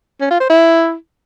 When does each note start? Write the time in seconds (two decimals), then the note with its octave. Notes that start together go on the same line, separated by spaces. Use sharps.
0.21 C#4
0.31 F4
0.40 C5
0.50 E4